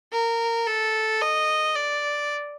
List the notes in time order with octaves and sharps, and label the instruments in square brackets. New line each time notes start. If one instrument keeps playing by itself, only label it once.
[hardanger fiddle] A#4
A4
D#5
D5